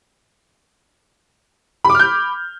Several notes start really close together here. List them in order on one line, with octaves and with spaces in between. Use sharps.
B5 D6 F6 G6